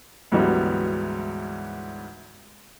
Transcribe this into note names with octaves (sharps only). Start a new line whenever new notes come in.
D2 G#2 E3 F#3 G3 B3